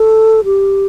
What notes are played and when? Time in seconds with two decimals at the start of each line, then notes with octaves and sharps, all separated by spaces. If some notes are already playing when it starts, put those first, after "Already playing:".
Already playing: A4
0.45 G4